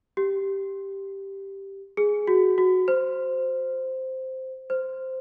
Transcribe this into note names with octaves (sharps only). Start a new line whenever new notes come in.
G4
G#4
F#4
F#4
C5
C5